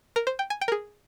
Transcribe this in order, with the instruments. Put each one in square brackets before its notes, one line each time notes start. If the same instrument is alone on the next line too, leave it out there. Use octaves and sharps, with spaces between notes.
[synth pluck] A#4
C5
G5
G#5
G5
A#4
G#4